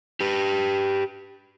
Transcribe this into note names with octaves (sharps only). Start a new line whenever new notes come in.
G4 B4